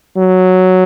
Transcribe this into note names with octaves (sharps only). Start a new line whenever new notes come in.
F#3